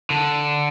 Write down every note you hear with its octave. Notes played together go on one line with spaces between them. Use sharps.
D3